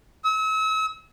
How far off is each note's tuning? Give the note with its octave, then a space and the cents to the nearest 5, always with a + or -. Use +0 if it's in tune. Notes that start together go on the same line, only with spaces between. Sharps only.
E6 -40